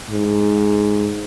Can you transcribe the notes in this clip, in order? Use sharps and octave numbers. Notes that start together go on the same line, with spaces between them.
G#2